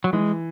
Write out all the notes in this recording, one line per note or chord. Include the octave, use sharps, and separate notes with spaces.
F#3
E3 G#3